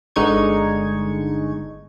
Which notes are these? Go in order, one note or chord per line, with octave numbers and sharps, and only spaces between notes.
G1 D3 G#3 D#4 C#6 G#6